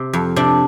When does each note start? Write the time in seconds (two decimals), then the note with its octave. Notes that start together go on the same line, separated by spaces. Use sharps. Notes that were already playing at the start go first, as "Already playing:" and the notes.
Already playing: C3
0.13 F2
0.36 C3 D4